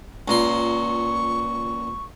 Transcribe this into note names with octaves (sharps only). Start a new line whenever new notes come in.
C#2 A#2 C6 C#6